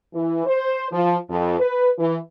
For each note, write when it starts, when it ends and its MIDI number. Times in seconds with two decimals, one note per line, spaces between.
0.14 0.44 52
0.46 0.85 72
0.92 1.16 53
1.29 1.56 41
1.59 1.89 71
1.98 2.17 52